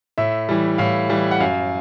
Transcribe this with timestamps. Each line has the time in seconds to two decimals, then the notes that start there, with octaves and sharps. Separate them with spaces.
0.18 A2 E5
0.49 E3 G3
0.78 A2 F5
1.09 E3 G3
1.31 F#5
1.40 F#2 F5